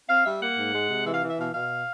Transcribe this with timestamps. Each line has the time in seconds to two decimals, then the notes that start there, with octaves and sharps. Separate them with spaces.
0.09 C4 F5
0.25 G3 E5
0.41 A#3 F#5
0.58 G#2
0.74 G#3
0.90 C3
1.06 E3 E5
1.14 F5
1.23 E3
1.30 E5
1.38 B2 F5
1.54 B2 F5